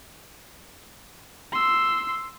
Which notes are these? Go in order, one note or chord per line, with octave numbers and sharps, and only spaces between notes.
C6 E6